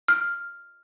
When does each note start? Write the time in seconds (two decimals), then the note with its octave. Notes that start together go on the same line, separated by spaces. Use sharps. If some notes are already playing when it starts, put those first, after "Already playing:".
0.08 F6